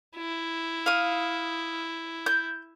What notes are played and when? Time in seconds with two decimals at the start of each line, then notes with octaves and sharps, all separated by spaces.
0.17 E4
0.86 F5 D#6
2.26 G6